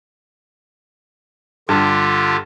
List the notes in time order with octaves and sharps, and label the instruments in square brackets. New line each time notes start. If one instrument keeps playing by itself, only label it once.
[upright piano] G2 [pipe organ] D3 F4 G4